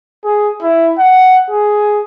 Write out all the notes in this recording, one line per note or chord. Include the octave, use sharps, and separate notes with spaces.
G#4
E4
F#5
G#4